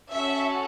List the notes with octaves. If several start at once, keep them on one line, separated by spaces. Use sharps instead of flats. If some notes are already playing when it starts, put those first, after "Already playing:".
C#4 F#4 A4 E5